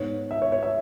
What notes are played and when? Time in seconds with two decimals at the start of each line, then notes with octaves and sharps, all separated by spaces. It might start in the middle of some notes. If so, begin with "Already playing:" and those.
Already playing: G#2 G#3 B3 C#5
0.31 E5
0.42 C#5
0.52 C#5
0.63 E5